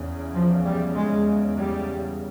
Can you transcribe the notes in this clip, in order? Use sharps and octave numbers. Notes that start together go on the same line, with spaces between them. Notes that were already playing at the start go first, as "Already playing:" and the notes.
Already playing: E2 C#3
F3
G3
G#3
G3